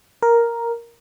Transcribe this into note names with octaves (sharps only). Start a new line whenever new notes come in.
A#4